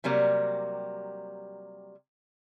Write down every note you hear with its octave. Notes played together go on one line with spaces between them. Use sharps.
C3 F#3 G3 A#3